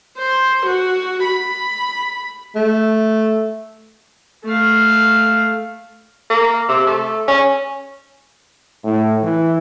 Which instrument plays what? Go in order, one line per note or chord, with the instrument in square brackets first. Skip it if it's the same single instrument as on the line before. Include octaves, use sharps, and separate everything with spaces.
[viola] C5
F#4
B5
[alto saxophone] A3
[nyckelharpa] A3 F5
[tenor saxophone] A#3
C3
A3
C#4
[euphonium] A2
E3